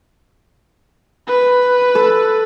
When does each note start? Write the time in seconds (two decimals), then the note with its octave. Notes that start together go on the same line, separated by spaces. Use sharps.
1.28 B4
1.95 A4